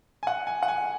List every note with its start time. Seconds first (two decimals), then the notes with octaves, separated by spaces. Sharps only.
0.23 G#5
0.27 F#5
0.47 G#5
0.63 F#5
0.68 G#5